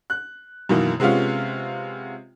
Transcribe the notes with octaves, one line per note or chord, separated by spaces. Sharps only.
F#6
F#2 B2 D#3 E3 A#3
C3 G#3 B3 C#4 F4